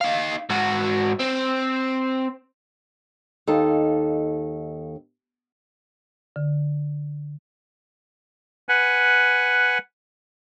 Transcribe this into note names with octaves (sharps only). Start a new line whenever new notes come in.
D#4 F5
G#2 F#4
C4
D#2 D#4 A4 F5
D3
B4 F#5 G#5